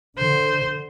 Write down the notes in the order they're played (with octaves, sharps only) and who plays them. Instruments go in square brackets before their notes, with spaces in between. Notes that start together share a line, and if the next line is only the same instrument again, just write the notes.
[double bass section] D3 [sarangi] C5